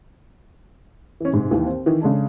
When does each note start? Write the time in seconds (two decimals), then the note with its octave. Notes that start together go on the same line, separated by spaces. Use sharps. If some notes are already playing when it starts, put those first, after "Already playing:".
1.20 E3 C#4
1.32 G#2 C3
1.51 D#2 D#3 E3
1.66 C4
1.86 D#3 E3
2.01 C#3 G#3 D4 A4